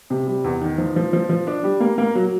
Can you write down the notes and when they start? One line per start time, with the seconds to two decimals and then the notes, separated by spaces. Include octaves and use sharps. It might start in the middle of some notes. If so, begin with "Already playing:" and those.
0.10 C3
0.27 G3
0.44 E2
0.61 D#3
0.78 F3
0.96 F3
1.13 F3
1.29 F3
1.47 D4
1.64 G3
1.80 A#3
1.98 A#3
2.15 F#3